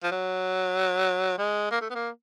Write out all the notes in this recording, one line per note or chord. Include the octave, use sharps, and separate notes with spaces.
F3
F#3
G#3
A#3
A3
B3
A#3